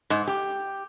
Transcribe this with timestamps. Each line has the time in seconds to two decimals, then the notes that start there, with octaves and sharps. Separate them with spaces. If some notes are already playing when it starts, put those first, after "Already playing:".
0.10 G#2
0.27 G4